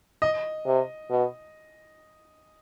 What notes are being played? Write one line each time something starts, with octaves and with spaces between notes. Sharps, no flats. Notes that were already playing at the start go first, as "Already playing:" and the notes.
D#5
C3
B2